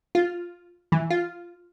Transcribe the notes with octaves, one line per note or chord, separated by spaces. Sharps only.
F4
E3
F4